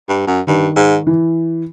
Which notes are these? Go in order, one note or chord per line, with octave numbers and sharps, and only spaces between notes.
G2
F#2
G2 D#3
G#2
E3